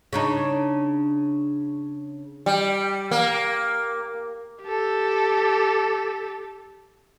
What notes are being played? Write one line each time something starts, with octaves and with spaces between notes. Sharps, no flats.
C#3 D4 D#4
G3
A#3
G4 A4